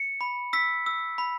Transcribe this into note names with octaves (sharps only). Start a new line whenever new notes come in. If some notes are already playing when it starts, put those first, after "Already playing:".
Already playing: C#7
B5
E6 B6
E6
B5